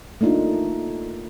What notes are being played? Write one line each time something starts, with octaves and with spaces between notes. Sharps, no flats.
A3 A#3 D4 D#4 F4